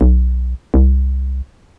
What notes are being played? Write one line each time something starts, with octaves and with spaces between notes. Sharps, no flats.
B1
C2